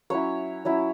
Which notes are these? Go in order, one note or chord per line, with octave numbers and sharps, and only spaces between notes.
F#3 C#4 E4 C#5
F#3 C#4 E4